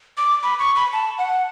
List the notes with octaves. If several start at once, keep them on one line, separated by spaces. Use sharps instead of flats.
D6
B5
C#6
B5
A5
F#5